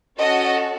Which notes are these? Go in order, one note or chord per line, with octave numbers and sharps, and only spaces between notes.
C#4 F#4 A4 D#5